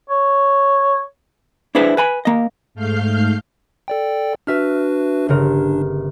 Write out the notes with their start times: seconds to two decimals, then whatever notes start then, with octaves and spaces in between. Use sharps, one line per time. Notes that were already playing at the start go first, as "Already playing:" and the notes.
0.10 C#5
1.75 D4 E4 G#4 B4 C5
1.97 B4 G#5 B5
2.25 A#3 D#5
2.75 G#2 A3 F5 F6 G6 C7
3.88 A4 D5 G5
4.47 D4 F#4 B4 E5 F6
5.28 G1 C#3 D4 A#4